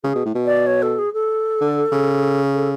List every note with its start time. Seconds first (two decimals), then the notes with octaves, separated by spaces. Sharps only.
0.04 C#3 G#4
0.15 B2
0.25 A2
0.35 B2
0.46 D5
0.67 C#5
0.82 A4
0.98 G#4
1.14 A4
1.61 D3
1.92 C#3
2.54 A4